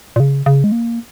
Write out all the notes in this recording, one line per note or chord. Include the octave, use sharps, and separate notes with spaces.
A#2
C#3
C#3
G#3
A#3